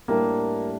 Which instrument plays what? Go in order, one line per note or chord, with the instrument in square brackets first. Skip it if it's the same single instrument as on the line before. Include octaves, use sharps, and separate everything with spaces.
[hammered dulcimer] A2 G3 D4 [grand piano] A#3